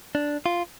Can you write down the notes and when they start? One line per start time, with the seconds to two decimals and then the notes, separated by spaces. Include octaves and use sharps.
0.15 D4
0.46 F4